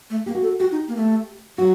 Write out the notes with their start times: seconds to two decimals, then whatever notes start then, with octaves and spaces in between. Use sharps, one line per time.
0.10 A3
0.26 A#3 G4
0.35 F#4
0.43 A4
0.60 F#4 G4
0.72 D#4
0.88 A#3
0.97 A3
1.58 F#3 F#4